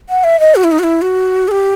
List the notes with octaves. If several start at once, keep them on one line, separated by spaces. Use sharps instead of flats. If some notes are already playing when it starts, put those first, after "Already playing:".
F#5
E5
D#5
F#4
E4
D#4
F#4
E4
F#4
A4
G4